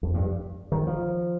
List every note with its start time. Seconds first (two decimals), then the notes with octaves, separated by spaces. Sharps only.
0.03 F2
0.14 G2
0.72 D#3
0.87 F3